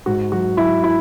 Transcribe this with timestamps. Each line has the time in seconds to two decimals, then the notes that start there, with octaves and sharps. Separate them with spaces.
0.06 G#2 F#4
0.32 F#3 F#4
0.57 F#3 E4
0.83 E4